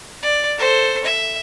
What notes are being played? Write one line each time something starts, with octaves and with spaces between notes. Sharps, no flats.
D5
A4 C5
E5